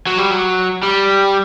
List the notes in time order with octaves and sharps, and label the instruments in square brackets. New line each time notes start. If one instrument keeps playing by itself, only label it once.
[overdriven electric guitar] F#3
G3
F#3
G3